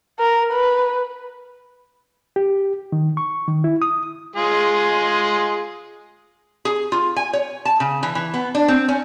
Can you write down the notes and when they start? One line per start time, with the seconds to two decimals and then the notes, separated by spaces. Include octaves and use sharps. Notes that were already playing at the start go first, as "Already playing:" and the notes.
0.20 A#4
0.52 B4
2.36 G4
2.92 D#3
3.17 C#6
3.47 D#3
3.64 E4
3.82 D#6
4.36 G#3 F4 G#4
6.65 G#4
6.92 F4
7.16 G#5
7.33 C#5
7.65 A5
7.80 C#3
8.03 E3
8.15 E3
8.34 B3
8.55 D4
8.68 C4
8.88 C#4